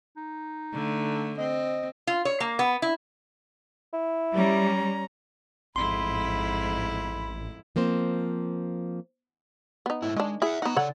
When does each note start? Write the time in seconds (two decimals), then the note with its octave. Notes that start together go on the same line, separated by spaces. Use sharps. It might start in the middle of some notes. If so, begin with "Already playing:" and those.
0.17 D#4
0.73 D3 A3
1.38 C4 D#5
2.07 F4
2.25 C#5
2.40 A#3
2.59 B3
2.82 E4
3.93 E4
4.34 G3 C#4 A#5
5.76 A1 F2 G#2 E4 B5 C6
7.76 F3 A#3 C4 C5
9.86 B3 D#4
10.02 G#2 E4
10.17 D#3 G#3 D4
10.42 E4 G#4 E5 F#5
10.62 B3 D#4 F#5 A#5
10.76 C#3 A4 C#5 D5 F#5